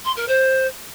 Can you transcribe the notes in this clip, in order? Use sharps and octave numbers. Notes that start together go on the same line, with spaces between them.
C6
A#4
C5